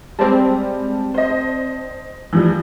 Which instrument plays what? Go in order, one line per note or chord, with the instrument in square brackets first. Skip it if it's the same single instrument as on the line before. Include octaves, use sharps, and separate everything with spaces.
[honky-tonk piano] G3 G#3 [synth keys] C4 D5 A5
[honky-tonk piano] C5 D#5
E3 F3 G3